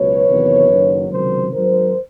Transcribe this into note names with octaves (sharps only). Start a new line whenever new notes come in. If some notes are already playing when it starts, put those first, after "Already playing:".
Already playing: C#2 B2 F#3 B4 C#5
E2 C3 D#3 F#3
F#1 F#2 D#3 F#3
C#2 C3 D#3 F#3 A#4 C5
G#1 G#2 D#3 F#3 A#4 C5